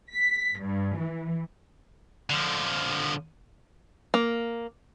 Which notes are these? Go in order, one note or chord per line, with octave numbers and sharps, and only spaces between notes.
B6
G2
E3
D3 F3
A#3